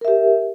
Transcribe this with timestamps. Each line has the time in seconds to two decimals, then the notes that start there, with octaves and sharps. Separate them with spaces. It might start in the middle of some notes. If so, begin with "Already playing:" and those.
0.01 A#4
0.05 E5
0.08 G4